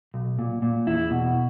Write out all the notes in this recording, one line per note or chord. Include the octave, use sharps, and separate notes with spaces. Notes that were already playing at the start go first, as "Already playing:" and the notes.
B1
A#2
A#2
E2 E4
B2